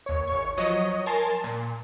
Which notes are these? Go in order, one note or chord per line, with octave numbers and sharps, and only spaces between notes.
D#2 C#5
G#1 C#5 C#6
F3 F#3 C#5 D#5
A#4 G#5 A5 C6 A6
A#2